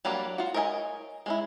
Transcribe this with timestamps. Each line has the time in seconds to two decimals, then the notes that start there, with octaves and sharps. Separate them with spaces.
0.05 F#3 G3 A#3 D4 A#4
0.38 F4 F#4
0.54 A#4 C#5 D#5 E5 G#5
1.26 G#3 C#4 E4